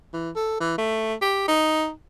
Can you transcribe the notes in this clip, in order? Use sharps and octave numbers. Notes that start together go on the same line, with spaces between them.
E3
A4
E3
A3
G4
D#4